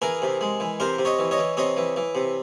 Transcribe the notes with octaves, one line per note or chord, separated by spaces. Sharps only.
E3 G#4 A#4
C3
G#3
E3
C3 A#4 C5
C3
C#5 D#5
E3
C#5 D#5
E3
C3 C#5 D#5
E3
E3
C3